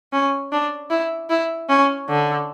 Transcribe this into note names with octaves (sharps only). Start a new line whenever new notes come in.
C#4
D4
E4
E4
C#4
D3